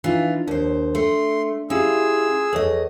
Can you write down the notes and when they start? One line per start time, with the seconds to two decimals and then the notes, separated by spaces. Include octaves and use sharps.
0.04 E3 D4 D#4 F4
0.48 D#2 D4 C5
0.95 A3 C6
1.70 C#4 E4 F4 G4 G#4 E6
2.53 E2 A4 C#5 D#5